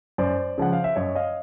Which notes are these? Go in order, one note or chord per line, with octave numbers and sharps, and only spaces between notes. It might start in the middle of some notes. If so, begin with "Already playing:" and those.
F#2 C5 D5
C#3 F3 G#3 F#5
F5
E5
F#2 C#5 D#5
D#5 F5